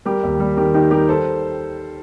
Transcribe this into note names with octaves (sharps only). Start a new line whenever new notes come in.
G3 G4 A#4
D#2
G3
D#3 G4 A#4
D#3 D#4 G4
G3 G4 A#4
A4 C5